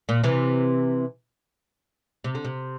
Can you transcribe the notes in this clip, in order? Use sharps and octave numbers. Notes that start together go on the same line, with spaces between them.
A#2
C3 E3
C3
D3
C3